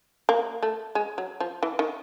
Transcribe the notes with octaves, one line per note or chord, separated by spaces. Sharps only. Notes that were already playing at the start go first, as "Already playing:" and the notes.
A#3
A3
G#3
F#3
F3
E3
D#3